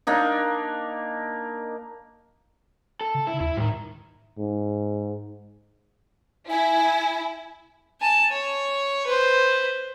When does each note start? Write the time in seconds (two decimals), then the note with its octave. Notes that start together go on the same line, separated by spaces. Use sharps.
0.07 A#3 D4 D#4
3.01 A4
3.15 C#3
3.27 E4
3.40 D#2 E4
3.57 A2 D#3 G3
4.38 G#2
6.50 E4 G#5
8.01 G#5 A5
8.31 C#5
9.07 B4 C5